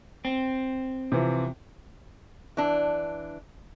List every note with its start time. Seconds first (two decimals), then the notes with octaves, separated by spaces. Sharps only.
0.25 C4
1.12 C3 E3 F3
2.57 E3 D4